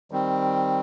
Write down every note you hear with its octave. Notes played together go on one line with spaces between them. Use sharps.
D#3 G3 C4